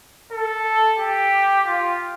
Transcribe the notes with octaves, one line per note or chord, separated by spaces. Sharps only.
A4
G4
F4